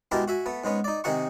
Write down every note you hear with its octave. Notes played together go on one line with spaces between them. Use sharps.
B2 G#3 E4 G4 A#4 A5
F#4 E5 G#5
A3 B3
G#2 G#3 B3 C#4
D#4 D5
C3 D#3 D#4 G#4 F#5 C#6